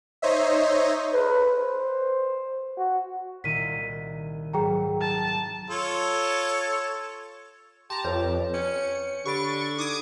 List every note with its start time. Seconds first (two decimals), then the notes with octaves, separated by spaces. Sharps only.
0.22 D#4 C5 C#5 D#5 E5
1.13 B4
1.57 C5
2.78 F#4
3.44 C2 A#2 D#3 B6 D#7
4.53 G#2 F#3 G#4 G5 A#5
5.01 A5
5.70 F4 A4 C#5
7.90 G4 A5 A#5 C6
8.04 F2 B4 C#5 G6
8.54 C#4 C#7
9.26 D3 G4 B5 C#6 A6 D7
9.78 D#4 D6 D#6 G#6